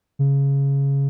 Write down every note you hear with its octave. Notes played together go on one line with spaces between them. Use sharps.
C#3